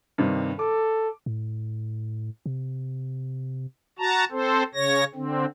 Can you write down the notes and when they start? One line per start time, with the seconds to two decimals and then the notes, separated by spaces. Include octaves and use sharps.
0.18 G2 C3 D#3
0.59 A4 D6
1.26 A2
2.46 C3
3.99 F#4 A5 A#5
4.31 C4 A4 C5
4.74 C#3 C#5 A#6
5.15 D3 C4